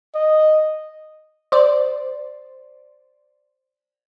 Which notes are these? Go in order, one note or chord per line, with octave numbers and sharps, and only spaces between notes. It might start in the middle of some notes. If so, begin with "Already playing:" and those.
D#5
C5 D5